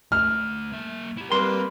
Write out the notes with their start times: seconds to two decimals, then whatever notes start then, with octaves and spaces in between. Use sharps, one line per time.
0.12 D2 A3 F6
0.72 A#3 E5
1.18 E4 G4
1.32 G3 A#3 C4 B4 C6